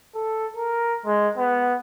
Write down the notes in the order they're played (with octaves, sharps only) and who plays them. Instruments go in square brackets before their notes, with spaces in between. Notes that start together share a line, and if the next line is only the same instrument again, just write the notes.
[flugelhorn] A4
A#4
G#3
B3